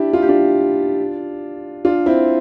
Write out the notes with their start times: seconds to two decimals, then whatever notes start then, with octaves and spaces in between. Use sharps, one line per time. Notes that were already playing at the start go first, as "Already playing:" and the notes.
Already playing: D4 E4 G4
0.13 F4
0.22 G4
0.29 D4 F4
1.85 D4 F4
2.06 C4 E4